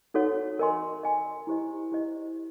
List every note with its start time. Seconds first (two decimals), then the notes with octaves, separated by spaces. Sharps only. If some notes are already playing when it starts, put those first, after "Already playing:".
0.14 D#4 F#4 A4 C#5 F#5
0.59 A#4 D#5 G#5 C6
1.03 A#4 D#5 G#5 C6
1.47 E4 G4 C5 D#5
1.92 E4 G4 C5 D#5